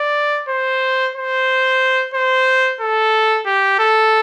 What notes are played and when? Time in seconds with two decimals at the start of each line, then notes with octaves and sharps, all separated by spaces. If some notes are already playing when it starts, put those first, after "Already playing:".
Already playing: D5
0.49 C5
1.15 C5
2.14 C5
2.80 A4
3.46 G4
3.80 A4